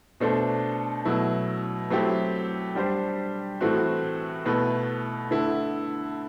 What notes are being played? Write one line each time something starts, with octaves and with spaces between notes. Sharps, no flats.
B2 A3 D4 A4 C5
B2 F#3 A3 E4
F#3 A3 C4 E4 G4
G3 D4 G4 C5
A2 E3 A3 C4 F#4
B2 A3 E4 B4
D3 A3 E4